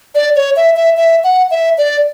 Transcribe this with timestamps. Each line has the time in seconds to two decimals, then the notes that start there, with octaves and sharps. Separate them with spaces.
0.15 D5
0.36 C#5
0.56 E5
0.76 E5
0.97 E5
1.24 F#5
1.51 E5
1.78 D5